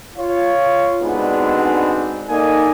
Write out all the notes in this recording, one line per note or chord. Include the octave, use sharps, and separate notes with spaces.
F4 C#5
G#2 B2 D3 B3 C4 D4
A#3 D#4 A4 D5 D#5 G#5